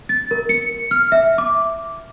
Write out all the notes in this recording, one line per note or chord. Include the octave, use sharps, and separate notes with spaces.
A6
A#4
C#7
F6
E5
D6